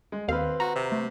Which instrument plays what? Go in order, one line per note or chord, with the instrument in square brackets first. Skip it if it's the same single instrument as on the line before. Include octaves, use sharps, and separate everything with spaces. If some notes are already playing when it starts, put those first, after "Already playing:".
[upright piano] G#3
[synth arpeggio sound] D#2 F5 [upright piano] C4 B4
[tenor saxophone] F#4 [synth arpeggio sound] A#5
[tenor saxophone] C3
[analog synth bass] A3